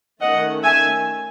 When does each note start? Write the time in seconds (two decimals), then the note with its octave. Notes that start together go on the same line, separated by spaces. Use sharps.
0.21 D#3 A3 C#4 D#5 F#5
0.63 E5 G#5